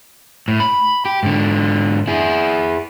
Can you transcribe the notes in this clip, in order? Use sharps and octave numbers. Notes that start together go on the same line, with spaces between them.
A2
B5
G4
G#2 D3
E4 G#4